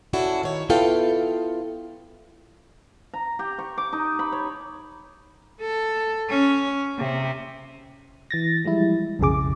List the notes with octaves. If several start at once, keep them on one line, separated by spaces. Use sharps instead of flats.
C#4 D4 E4 F#4 A4
D#3 C#5
B3 E4 F4 A4 F5 G5
A#5
G4
C#6
D6
D#4
B5
C#5
A4
C#4
C3
E3 A6 A#6
F3 G3 G#3 E4
B1 F2 C#3 G#4 D6